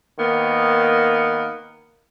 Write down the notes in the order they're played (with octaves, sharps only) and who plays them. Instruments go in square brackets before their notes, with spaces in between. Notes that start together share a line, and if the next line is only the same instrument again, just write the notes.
[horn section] D#3 A#3 B3